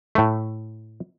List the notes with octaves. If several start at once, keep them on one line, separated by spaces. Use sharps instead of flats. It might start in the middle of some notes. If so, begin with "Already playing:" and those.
A2 A3